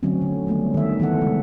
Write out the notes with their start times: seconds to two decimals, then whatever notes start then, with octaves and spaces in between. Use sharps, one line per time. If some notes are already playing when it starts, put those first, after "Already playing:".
0.03 D3 F#3 A3 C4 C#4
0.22 D3
0.47 D#3 G3 A3 B3
0.74 D#3 E5
1.00 E3 B3 A4 F#5
1.21 C#3 G#3 B3